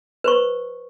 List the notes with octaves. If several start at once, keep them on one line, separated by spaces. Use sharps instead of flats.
B4 C5 C#6